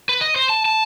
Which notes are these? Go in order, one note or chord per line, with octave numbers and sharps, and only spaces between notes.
B4
D#5
C5
A5
A5